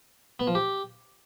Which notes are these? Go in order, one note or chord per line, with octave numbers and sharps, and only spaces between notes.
B3
F3
G4